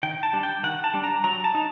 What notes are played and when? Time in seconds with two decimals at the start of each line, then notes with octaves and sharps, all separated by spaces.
0.03 D#3 G5
0.23 A5
0.33 G3 D4
0.43 G5
0.63 D#3 F#5
0.84 A5
0.94 G3 D4
1.04 A#5
1.24 F#3 A#5
1.44 A5
1.55 D#4